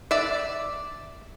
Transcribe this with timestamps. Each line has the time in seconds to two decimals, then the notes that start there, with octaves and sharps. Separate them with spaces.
0.11 D5 E5